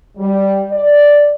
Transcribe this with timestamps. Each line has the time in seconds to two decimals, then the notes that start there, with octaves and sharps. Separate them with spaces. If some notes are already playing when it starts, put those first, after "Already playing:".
0.17 G3
0.70 D5